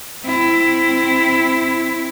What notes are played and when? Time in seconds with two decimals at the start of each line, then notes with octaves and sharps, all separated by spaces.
0.24 C4 E4